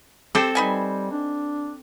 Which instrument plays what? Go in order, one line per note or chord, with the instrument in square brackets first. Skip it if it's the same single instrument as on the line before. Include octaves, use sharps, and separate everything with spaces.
[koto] C4 A4 C5 [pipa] G4
[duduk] G3 [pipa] D#4 B4 G#5
[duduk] D4